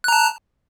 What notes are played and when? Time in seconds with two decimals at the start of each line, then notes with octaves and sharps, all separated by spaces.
0.04 F#6
0.08 A#5
0.12 A5